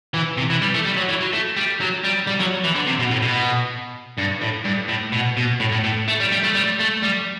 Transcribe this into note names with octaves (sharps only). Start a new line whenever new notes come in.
E3
C3
E3
G3
A3
G3
F#3
E3
F#3
A3
G3
F#3
G3
G3
F#3
E3
D3
C3
B2
A2
B2
G2
A2
G2
A2
B2
B2
A2
A2
A2
A3
G3
G3
A3
G3
A3
G3